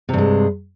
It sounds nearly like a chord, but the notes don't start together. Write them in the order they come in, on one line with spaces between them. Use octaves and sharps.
C3 G2 G#3